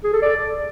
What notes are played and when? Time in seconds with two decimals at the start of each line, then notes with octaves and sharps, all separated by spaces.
0.04 G#4
0.13 A4
0.22 D5